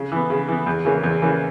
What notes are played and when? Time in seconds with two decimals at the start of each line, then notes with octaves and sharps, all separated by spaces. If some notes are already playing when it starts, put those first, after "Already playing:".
Already playing: C#3
0.12 E3 B3
0.30 C#3
0.48 E3 B3
0.66 E2
0.85 C#3 E3 A#3 C#4
1.04 E2
1.22 C#3 E3 A#3 C#4